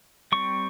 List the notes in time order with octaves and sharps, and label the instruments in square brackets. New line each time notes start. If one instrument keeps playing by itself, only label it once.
[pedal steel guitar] G3 C4 C#6